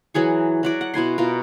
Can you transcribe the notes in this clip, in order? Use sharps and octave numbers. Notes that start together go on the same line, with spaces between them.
E3 F#3 G#4 C#6
F#3 F#4 D5
F#5
B2 E4 G#5 C6
B2 F4 A#4